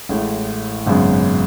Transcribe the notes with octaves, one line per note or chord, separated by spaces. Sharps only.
A1 A2 G#3
G#1 F#2 C#3 G#3 B3